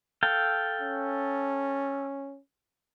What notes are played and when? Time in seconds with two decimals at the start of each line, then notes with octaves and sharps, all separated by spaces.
0.23 A4 F5 G5
0.81 C#4